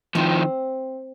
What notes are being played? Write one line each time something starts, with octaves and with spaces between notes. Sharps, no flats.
D#3 F3 C4